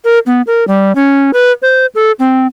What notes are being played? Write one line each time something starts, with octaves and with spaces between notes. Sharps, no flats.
A#4
B3
A#4
G3
C#4
B4
C5
A4
C4